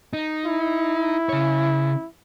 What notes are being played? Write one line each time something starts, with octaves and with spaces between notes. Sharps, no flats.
D#4
E4
C#3 C#5